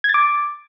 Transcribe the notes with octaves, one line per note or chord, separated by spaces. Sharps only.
G#6
A6
D6